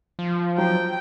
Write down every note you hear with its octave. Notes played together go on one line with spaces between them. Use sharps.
F3
F#3 G5